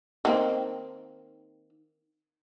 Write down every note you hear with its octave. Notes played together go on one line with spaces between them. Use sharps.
D#3 A#3 C4